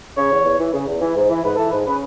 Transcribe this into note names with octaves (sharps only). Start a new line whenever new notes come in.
C#3 C#5
E2
E2
E3
C#3
E2
E3
G#2
E3
G#2 B4
E3 A4
G#2 B4
C#3 B4